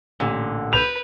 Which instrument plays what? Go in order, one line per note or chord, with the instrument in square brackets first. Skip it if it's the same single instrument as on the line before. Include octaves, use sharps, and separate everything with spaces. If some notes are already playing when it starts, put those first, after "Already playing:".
[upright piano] A1 [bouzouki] A#2 D3
[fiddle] B4 [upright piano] B5 G6 E7 [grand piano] F7